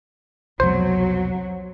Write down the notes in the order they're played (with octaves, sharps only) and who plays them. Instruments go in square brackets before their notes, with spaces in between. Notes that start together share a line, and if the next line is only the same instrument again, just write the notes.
[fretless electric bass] C2 F2 B2 [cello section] F#3 [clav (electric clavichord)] C5